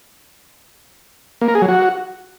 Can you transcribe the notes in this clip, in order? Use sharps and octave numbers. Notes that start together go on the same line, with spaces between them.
A#3
A#4
G#4
F#3
F#4